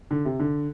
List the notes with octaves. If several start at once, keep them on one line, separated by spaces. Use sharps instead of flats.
D3
C3
D3